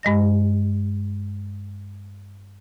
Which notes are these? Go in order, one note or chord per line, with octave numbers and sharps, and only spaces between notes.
G2 G#3 D#5 A#6